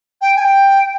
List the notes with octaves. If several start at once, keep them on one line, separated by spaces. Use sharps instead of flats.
G5
G#5
G5